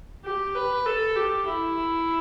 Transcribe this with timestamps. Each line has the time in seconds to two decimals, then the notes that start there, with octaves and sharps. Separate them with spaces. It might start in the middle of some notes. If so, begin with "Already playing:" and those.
0.25 G4
0.55 B4
0.86 A4
1.16 G4
1.47 E4